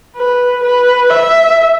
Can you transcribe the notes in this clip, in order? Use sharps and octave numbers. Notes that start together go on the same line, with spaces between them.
B4
B4
E5